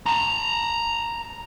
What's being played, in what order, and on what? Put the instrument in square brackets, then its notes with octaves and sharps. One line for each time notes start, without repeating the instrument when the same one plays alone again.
[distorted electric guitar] A5 A#5